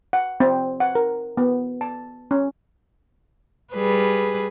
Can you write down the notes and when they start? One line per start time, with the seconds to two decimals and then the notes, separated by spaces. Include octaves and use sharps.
0.13 F#5
0.40 C4
0.80 F#5
0.95 A#4
1.37 B3
1.81 A5
2.31 C#4
3.74 G3 G#4 B4